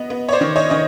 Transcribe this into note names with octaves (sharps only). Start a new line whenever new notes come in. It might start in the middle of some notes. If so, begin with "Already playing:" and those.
Already playing: B3 D#5
B3
C#5
C5 D5
D#3
C#5 D#5
D#3 D#5